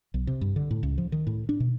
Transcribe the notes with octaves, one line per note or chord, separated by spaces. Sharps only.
B1
C3
G2
D3
A2
C#2
F3
D#3
A2
D4
B2